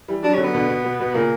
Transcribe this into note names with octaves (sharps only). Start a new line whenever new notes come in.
E3 G3
F#3 D4
G3
D3 F#3 C#4
B3
B2 D3
B2
B2
B2
A#2 C#3 A#3